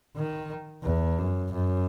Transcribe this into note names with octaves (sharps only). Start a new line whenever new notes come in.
D#3
E2
F#2
F#2